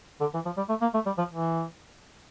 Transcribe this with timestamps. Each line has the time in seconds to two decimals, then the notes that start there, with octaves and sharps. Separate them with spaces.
0.21 D3
0.34 E3
0.45 F3
0.57 G3
0.69 A3
0.82 A#3
0.94 A3
1.06 G3
1.18 F3
1.31 E3